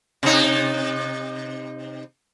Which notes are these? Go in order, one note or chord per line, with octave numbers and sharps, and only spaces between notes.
C3 D#4